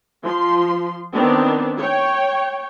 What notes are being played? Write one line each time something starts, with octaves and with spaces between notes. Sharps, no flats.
F3 C6
D#3 B3 C4 D4
C#5 G5